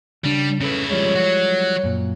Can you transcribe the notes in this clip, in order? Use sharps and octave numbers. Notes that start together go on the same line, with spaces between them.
C#3 G3 D4
C#3 C#4 E4 A4 B4
F3 G3 G#3 C#5
F#3 F#4
F#2 A#2